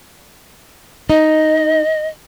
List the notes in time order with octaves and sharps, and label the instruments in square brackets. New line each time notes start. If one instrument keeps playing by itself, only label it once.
[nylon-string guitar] D#4 [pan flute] D#5